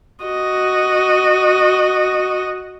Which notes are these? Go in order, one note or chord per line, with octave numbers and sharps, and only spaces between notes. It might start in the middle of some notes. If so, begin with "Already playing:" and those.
F#4 D#5